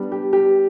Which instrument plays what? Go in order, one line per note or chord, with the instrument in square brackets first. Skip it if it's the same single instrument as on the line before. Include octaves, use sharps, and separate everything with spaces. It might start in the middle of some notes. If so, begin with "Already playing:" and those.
Already playing: [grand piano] G3 B3 D4
[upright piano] G4
G4